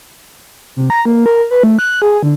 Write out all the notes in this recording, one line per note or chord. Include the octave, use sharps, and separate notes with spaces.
C3
A#5
A#3
A#4
B4
A3
F#6
G#4
D3